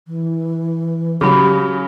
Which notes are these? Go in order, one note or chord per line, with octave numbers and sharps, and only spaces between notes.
E3
C#3 F#3 G4 G#4 B5